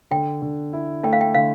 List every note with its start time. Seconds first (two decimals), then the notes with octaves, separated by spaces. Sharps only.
0.11 D3 G5
0.42 D3
0.73 E4
1.03 A3 G5
1.13 F5
1.21 G5
1.34 D3 F5